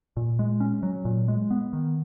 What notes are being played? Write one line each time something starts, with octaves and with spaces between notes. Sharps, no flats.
A#2
G#3
C#4
F#3
A#2
G#3
B3
D#3